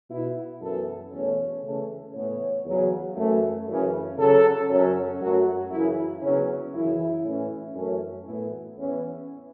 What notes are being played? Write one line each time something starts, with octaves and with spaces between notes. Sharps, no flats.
B2 B3 E4
F#2 E3 B3 A4
E2 B2 A3 C#4 C#5
C#3 E3 A3 C#4
A2 E3 B3 C#5
E2 C#3 F#3
F#2 E3 A3
F#2 C#3 E3 C#4
C#3 F#3 C#4 A4
F#2 F#3 C#4
F#2 F#3 A3 F#4
F#2 C#3 E3 E4
C#3 F#3 B3 C#4
F#2 C#3 E3 E4
A2 E3 C#4
F#2 E3 A3 C#4
A2 E3 B3 E4
E2 E3 B3 C#4